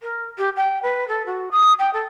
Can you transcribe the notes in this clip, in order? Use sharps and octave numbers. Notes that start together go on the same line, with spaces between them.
A#4
G4
G5
B4
A4
F#4
D#6
G5
A4